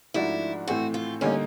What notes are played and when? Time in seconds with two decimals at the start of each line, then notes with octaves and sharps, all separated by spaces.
0.14 G#2 F3 A3 D4 E4 F#4
0.68 A2 E3 A3 C4 F#4
0.94 F4
1.21 D3 G3 A#3 C#4 D#4